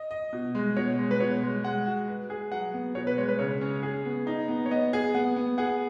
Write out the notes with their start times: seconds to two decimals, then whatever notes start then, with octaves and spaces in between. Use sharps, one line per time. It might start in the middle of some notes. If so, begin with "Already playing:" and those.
Already playing: D#5
0.11 D#5
0.33 B2
0.55 G#3
0.76 B2 C#5
0.99 G#3
1.11 B4
1.20 B2 C#5
1.43 G#3
1.64 G#3 F#5
1.86 F#4
2.08 B4
2.30 G#4
2.52 F#3 F#5
2.74 B3
2.95 B2 C#5
3.07 B4
3.18 G#3 C#5
3.29 B4
3.39 C#3 C#5
3.61 C#4
3.83 G#4
4.05 B3
4.27 D#4
4.48 B3
4.66 C#5
4.71 B3 D#5
4.93 G#4
5.15 B3 F#5
5.36 B3
5.58 G#4 F#5